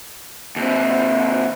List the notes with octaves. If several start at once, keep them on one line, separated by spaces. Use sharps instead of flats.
D#2 C3